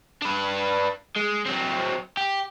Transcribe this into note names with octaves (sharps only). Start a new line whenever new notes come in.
D4 B4
G#3
F#3 C4
G4